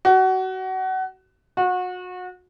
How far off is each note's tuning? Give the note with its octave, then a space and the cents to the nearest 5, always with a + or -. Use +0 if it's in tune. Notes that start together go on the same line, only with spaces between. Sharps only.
F#4 +25
F#4 -30